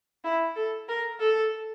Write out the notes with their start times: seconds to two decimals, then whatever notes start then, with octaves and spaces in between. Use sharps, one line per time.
0.24 E4
0.56 A4
0.88 A#4
1.20 A4